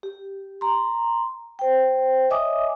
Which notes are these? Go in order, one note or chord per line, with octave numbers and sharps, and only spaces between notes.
G4
A#5 C6
C5 G5
C#5 D#5 E5 G#5 D6 D#6